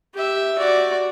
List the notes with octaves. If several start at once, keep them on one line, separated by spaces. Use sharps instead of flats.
G4 E5
F#4 D5